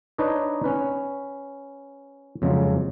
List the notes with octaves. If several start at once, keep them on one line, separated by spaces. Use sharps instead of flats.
D4 D#4 B4 C#5 D#5
C#4 B4
F2 C#3 F#3 G#3